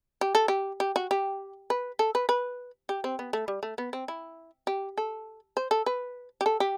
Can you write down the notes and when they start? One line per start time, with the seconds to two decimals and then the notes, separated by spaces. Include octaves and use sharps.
0.21 G4
0.35 A4
0.48 G4
0.80 G4
0.96 F#4
1.11 G4
1.70 B4
1.99 A4
2.15 B4
2.29 B4
2.89 G4
3.04 C4
3.19 B3
3.33 A3
3.48 G3
3.63 A3
3.78 B3
3.93 C4
4.08 E4
4.67 G4
4.98 A4
5.57 C5
5.71 A4
5.86 B4
6.41 G4
6.46 A4
6.60 G4